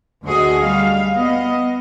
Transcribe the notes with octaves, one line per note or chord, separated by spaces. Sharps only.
D2 F#4 G#4 D#5
G3 F5
B3 D#5